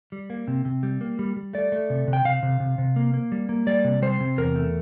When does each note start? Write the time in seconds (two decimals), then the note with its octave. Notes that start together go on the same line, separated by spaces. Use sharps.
0.12 G3
0.30 A#3
0.48 C3
0.65 C3
0.83 G3
1.01 A#3
1.19 G3
1.36 G3
1.53 A3 D5
1.72 A3
1.90 C3
2.07 C3
2.13 G5
2.25 C3 F5
2.43 C3
2.60 C3
2.78 C3
2.96 A#3
3.14 A#3
3.32 G3
3.49 A#3
3.67 G3 D5
3.84 C3
4.02 G3 C5
4.20 C3
4.38 E2 A#4
4.56 A3